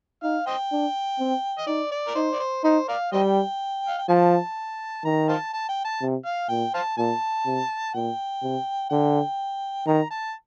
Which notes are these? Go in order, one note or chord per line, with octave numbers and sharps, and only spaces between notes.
D#4 F5
C5 D#5 G5
D4
C4
D#5
D#4 D5
D5
A#4
D#4 C5
D5
C5
D#4 C5
A#4 D5 F5
G3 C5 D#5 G5
F5
G5
F3 A5
D#3 A#5
C5 F5 A5
A5
G5
A5
C3
F5
A#2 G5
C5 F5 A5
A#2 A5
C3
A#2 G5
C3
D3 G5
D#3 A#5
A5